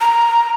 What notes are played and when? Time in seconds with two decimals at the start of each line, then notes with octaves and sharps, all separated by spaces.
0.01 A#5